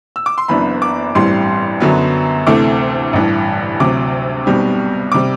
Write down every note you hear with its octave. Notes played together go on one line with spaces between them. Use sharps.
E6
D6
C6
F#1 F#2 E3 B3 D4 B5
D6
A1 G2 E3 G3 C4 C6
F#2 D3 F#3 B3
D2 C3 E3 A3 C4 D6
A1 G2 E3
D2 C3 F#3 D6
B1 B2 G3 C4
C3 G3 D6